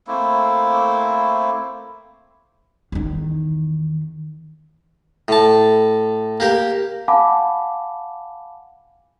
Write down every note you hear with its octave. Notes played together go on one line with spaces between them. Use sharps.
A3 A#3 C4 E4
E2 D#3
A2 A5
A#3 G4 A#4
F5 F#5 G#5 A5 B5 D6